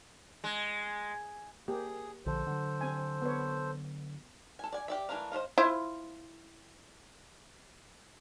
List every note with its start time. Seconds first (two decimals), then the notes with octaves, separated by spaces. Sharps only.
0.44 G#3
1.68 A#3 G4 G#4
2.26 A#1 D3 F3 A4 C5
2.46 D3 F#3
2.81 C4 G#5
3.22 B3 B4 C#5
4.59 A4 G#5
4.72 D5 G#5
4.88 G4 D5 E5
5.09 E3 A3 D4 A#4 F5
5.32 C5 C#5 D#5 F5
5.58 E4 F4 C5